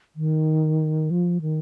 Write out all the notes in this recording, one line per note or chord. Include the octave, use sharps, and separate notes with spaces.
D#3
F3
D#3